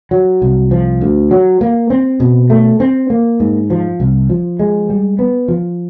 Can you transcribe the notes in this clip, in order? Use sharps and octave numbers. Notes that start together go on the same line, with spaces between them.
F#3
C2
F3
D2
F#3
A#3
C4
B2
A3
C4
A#3
G#2
F3
C2
F3
G#3
G3
B3
F3